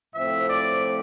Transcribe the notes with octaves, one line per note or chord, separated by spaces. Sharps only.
A2 F3 C4 E5
D5